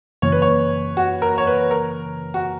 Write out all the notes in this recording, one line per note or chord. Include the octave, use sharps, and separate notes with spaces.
F#2 C#3 E3 A#3 C#5
B4
C#5
F#4
A#4
C#5
B4
A#4
F#4